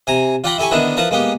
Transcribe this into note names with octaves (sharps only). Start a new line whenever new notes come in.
C3 G#5 A#5
F4 D5 F#5 G5 A#5 B5
E4 G4 A4 G#5 C#6
D3 D#3 B3 D4 E4 A#4
F3 E4 A#4 B4 A5 A#5
G#3 A#3 B3 G4